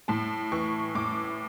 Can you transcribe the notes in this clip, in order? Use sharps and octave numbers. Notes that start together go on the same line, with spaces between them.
A2 A5
E3 C#6
A2 D6